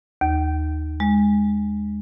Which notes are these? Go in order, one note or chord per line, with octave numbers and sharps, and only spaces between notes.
D#2
G#3